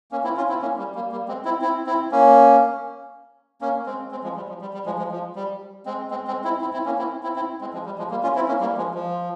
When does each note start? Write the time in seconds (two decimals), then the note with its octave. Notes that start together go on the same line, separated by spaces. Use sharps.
0.11 A#3 C#4
0.24 C4 E4
0.37 C#4 F4
0.49 C4 E4
0.62 A#3 C#4
0.78 G3
0.95 G3 A#3
1.12 G3 A#3
1.28 G#3 C4
1.45 C4 E4
1.61 C4 E4
1.86 C4 E4
2.12 A#3 C#4
3.61 A#3 C#4
3.86 G#3 C4
4.11 G#3 C4
4.24 F3 G#3
4.36 G3
4.49 F3
4.61 G3
4.74 G3
4.86 F3 G#3
4.98 F3 G#3
5.11 F3
5.36 G3
5.86 G#3 C4
6.10 G#3 C4
6.27 G#3 C4
6.44 C4 E4
6.61 C4 E4
6.73 C4 E4
6.86 A#3 C#4
6.98 C4 E4
7.23 C4 E4
7.36 C4 E4
7.61 G#3 C4
7.73 F3 G#3
7.86 G3
7.98 F3 G#3
8.11 G3 A#3
8.23 C#4 F4
8.35 C4 E4
8.48 A#3 C#4
8.60 G3 A#3
8.77 F3 G#3
8.94 F3